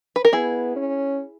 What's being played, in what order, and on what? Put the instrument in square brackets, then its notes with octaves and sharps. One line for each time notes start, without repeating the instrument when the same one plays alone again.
[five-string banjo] B4
A#4
[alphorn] B3 [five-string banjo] E4 G#4
[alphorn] C#4